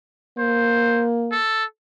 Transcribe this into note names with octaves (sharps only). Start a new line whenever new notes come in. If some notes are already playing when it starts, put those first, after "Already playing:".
A#3 C5
A4